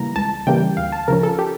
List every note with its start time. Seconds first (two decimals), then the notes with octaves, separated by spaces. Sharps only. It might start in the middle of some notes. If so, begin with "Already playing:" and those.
Already playing: C#3 E3 G3 A#3 A#5
0.16 C#2 A5
0.47 C#3 E3 G3 A#3 G5
0.77 D2 F5
0.92 A5
1.08 C#3 F3 C#4 A#4
1.23 A4
1.39 G4